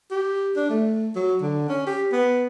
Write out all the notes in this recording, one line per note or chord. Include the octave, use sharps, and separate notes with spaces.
G4
D4
A3
F#3
D3
C#4
G4
B3